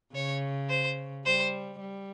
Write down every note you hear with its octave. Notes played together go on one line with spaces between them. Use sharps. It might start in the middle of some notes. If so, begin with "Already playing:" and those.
C#3 C#5
C5
G3 C5
G3